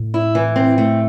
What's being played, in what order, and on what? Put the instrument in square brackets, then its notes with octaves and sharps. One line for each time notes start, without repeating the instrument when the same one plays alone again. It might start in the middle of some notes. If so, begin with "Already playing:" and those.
Already playing: [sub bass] A2
[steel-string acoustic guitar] E4
E3
C4
A3